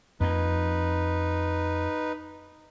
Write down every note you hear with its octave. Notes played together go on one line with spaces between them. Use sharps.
F2 A#3 D#4 B4